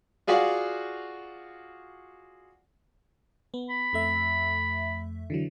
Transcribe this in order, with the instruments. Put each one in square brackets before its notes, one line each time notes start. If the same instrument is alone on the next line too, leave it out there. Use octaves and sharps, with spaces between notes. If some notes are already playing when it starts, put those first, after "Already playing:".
[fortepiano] F4 F#4 G#4 D5 F5 F#5
[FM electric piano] B3
[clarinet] B5
[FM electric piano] F2 A3 E5
D3 E3 F#3